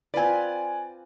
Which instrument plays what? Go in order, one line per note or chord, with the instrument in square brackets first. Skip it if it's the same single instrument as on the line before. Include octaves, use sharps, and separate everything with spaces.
[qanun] C4 F4 B4 [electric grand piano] D5 G#5